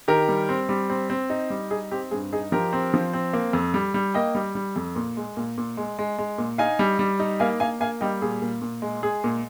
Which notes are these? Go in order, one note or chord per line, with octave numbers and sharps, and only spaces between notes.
D#3 G4 A#4
G3
C4
G3
C4
C4
D#4
G3
D#4 G#4
C4 G4
G2 G#4
D#4 G#4
F3 G4 A#4
C4
F3
C4
A#3
F2
G3
G3
A#3 D#5 G5
G3
G3
F2
A#2
G#3
A#2
A#2
G#3
G#3
G#3
A#2
D#4 F5 G#5
G3
G3
D#4
A#3 F5 G#5
A#3 F5 G#5
A#3 F5 G#5
G3 D#5 G5
A#2 G#4
A#2
A#2
G#3
G#3 G#4
A#2